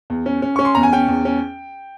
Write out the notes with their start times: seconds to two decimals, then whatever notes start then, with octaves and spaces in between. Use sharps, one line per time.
0.10 E2
0.26 C#4
0.42 C#4
0.56 C#4 C#6
0.65 C6
0.75 E2 A#5
0.83 G#5
0.93 C#4 G5
1.08 E2
1.25 C#4